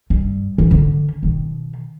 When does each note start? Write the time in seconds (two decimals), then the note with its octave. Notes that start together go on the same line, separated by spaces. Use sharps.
0.10 G2
0.58 E3
0.71 D3 C#4
1.23 B2 D#3